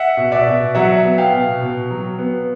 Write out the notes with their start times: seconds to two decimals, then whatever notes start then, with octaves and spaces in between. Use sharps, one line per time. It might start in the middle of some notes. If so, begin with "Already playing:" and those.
Already playing: E5 F#5
0.17 B2
0.32 D5 E5
0.47 B2
0.75 F#3 E5 F#5
1.04 B3
1.18 F5 G5
1.33 B2
1.61 B2
1.90 F#3
2.19 B3